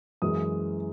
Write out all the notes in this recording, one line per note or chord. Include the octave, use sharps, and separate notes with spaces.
F#2 E3 G#3 D#6